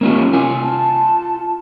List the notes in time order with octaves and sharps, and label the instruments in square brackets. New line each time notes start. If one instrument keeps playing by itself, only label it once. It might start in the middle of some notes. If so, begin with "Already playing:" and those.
[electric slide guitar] A#3 C#4 F4
F4 G#5
[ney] A5